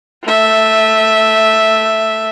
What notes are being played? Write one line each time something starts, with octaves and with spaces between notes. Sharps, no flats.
A3 E5